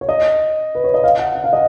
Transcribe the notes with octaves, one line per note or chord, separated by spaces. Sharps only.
C#5
D#5
B4
C#5
D#5
F5
F#5
F#5
F5
D#5